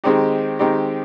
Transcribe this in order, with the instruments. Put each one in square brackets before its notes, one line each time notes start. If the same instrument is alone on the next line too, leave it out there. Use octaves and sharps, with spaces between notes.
[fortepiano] D#3 G#3 C4 D#4 G4
D#3 G#3 C4 D#4 G4